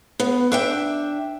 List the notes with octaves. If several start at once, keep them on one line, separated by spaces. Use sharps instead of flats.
B3
D4 E5 G5